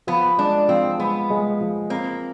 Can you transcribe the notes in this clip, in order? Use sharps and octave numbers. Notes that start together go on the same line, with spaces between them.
F3 B3
G#3 D4
F3 C4
G#3 B3
G#3
F3
A#3 C4